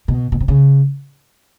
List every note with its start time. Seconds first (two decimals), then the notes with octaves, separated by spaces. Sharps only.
0.08 B2
0.32 B2
0.40 C3
0.48 C#3